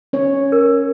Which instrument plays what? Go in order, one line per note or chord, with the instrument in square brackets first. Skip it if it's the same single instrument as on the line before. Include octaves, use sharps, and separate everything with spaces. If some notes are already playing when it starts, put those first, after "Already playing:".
[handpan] C#4 C#5
[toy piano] A#4